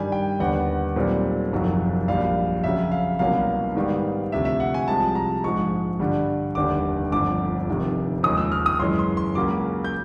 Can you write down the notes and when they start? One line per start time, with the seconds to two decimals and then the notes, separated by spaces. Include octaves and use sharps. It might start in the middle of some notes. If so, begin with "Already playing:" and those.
Already playing: G2 D#3 G3 G#5
0.12 G5
0.39 D#2 D3 G3 B3 F#5
0.96 B1 A#2 G3 C4
1.52 F#1 F2 C3 D#3 F#3
2.08 A#1 A#2 G3 F5
2.64 F2 C#3 F#3 E5
2.92 F5
3.19 C2 B2 F#3 A#3 C#4 F5
3.75 G#2 D#3 G3 B3
4.32 D2 C3 F3 E5
4.45 E5
4.60 F#5
4.74 G#5
4.88 C2 C3 F3 G#3 A5
5.15 A#5
5.43 A#1 G#2 F3 G#3 C#6
5.99 G2 D3 G3
6.55 F1 D#2 D3 G3 D6
7.12 G1 F2 D3 F3 D6
7.67 F1 F2 C3 D#3
8.23 D#2 C#3 F3 G#3 D#6
8.37 E6
8.52 F6
8.66 D#6
8.79 F#2 C#3 E3 G#3 C#4 C6
8.99 C6
9.17 C6
9.35 C#2 C#3 F#3 A#3 C#4 D6
9.84 G6